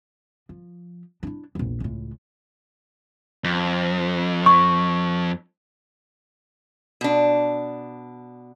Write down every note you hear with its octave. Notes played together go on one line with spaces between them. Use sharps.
F3
D4 E4
A#1 E2
C#2 A2
F2
C#6
B2 D4